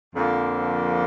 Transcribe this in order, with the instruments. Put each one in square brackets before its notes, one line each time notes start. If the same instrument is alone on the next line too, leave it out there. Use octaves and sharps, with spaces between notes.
[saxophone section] F2 D3 F3 A#3